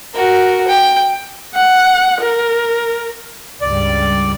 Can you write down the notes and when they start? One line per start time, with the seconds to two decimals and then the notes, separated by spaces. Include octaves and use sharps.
0.14 F#4 A#4
0.67 G5
1.55 F#5
2.21 A#4
3.62 C#2 G2 G3 D5